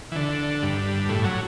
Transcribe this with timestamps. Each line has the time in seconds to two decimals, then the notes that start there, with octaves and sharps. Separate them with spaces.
0.12 E3
0.16 D3
0.63 G2
1.09 A2
1.24 F#3